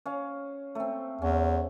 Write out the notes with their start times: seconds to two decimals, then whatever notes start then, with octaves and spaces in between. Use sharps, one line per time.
0.06 C#4 F5
0.75 A3 C4
1.22 E2 C#4